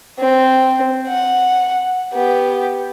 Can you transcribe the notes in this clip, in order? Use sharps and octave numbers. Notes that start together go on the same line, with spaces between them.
C4
F#5
B3 G4